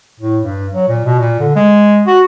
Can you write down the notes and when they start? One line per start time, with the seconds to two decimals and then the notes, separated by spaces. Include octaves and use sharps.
0.20 A2
0.43 G2
0.73 F#3
0.89 A#2
1.06 B2
1.19 A#2
1.40 D3
1.56 G#3
2.07 F#4